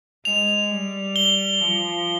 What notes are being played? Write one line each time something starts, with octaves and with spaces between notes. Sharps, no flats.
G#3 F7
G3
G7
F3